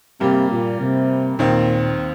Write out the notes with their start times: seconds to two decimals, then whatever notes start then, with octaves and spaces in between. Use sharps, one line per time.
0.20 G2 C3 G3 A#3 G4
0.50 A#2
0.80 C3
1.38 D#2 A#2 D#3 C4